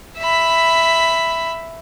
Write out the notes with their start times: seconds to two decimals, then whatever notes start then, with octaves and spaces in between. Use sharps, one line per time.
0.19 E5 B5